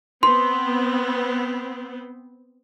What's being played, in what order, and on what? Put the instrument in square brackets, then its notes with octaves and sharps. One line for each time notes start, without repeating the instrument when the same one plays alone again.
[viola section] B3 C4 [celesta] C6